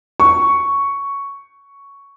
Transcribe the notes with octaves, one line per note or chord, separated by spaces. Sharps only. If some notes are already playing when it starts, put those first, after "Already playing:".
C#6